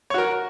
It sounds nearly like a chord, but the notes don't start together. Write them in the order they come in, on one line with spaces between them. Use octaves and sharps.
C#5 F#4 A#4